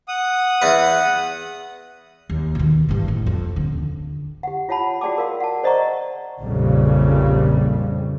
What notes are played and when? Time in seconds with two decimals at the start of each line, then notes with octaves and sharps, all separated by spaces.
0.08 F#5 D#6
0.62 E2 B4
2.30 D#2
2.55 B2 D#3
2.89 G2 E3
3.08 A2
3.26 F2
3.56 D#1 D3
4.43 G4 F#5
4.69 F4 C#5 F#5 A5 B5
5.01 F#4 G#4 D5 G5 A5 D6
5.18 A#4 F5 C6
5.40 F#5 A5
5.63 C5 D5 D#5 F#5 A#5 C#6
6.40 A#1 F2 C#3 G3